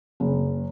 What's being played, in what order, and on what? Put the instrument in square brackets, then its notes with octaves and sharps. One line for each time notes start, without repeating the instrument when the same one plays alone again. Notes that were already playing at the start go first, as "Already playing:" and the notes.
[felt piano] F#1